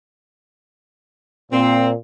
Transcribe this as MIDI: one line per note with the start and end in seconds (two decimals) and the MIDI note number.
1.51 1.94 46
1.51 1.89 60